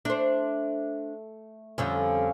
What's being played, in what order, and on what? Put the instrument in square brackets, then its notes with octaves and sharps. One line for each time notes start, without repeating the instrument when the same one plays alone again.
[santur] A3 [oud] D4 C5
[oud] F2 D3 G3 [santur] C#4 F5